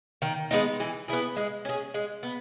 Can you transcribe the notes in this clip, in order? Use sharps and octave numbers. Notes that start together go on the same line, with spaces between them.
D#3
G#3 B3 D#4
E3
B3 E4 G#4
G#3
C#4 G#4
G#3
B3